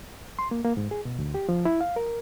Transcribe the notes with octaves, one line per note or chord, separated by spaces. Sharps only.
C6
A#3
A#3
G#2
G#4
B2
D2
G4
F3
E4
F5
A#4